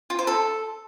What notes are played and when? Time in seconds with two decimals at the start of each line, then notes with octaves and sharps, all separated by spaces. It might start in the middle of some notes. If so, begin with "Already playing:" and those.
0.10 F4
0.19 C5
0.27 A4